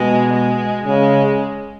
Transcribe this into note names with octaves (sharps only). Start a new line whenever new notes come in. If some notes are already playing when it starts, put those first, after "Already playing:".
Already playing: B2 G#3
G#3
C#3 G#3